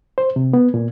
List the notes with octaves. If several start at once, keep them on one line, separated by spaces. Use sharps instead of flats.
C5
C3
B3
A#2